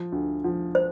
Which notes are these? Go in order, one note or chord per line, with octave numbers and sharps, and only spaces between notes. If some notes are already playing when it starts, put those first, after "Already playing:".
Already playing: F3
D2
F3
C5